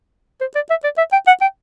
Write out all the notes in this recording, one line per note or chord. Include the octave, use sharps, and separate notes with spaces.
C5
D5
E5
D5
E5
G5
F#5
G5